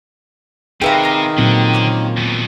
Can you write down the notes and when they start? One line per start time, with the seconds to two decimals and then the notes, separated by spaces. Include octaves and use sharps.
0.82 C3 D#3 G4 G#4 B4 E5 F5 A#5
1.03 E5 A#5
1.38 A#2 D3 F#3 C4
1.73 A#3 C#4 D6
2.17 D#2 B2